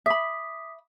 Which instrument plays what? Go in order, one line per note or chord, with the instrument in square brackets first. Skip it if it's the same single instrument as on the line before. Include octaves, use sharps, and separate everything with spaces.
[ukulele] E5 B5 [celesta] D6 D#6 B6